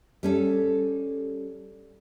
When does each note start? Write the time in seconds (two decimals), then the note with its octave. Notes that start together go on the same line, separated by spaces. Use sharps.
0.23 G3 C#4 A4